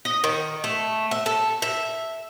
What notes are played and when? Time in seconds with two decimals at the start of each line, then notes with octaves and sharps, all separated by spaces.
0.05 D#5
0.24 D#3
0.64 A3
1.11 E5
1.26 A4
1.62 E5